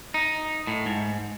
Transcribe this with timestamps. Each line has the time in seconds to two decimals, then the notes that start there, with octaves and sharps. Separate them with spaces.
0.14 D#4
0.67 A2
0.86 G#2